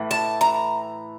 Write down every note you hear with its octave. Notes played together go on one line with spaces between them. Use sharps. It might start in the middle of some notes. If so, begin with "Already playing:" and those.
Already playing: A2 E3
A5
A#5